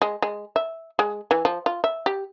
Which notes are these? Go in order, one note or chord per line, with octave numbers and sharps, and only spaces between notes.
G#3
G#3
E5
G#3
E3
F3
F4
E5
G4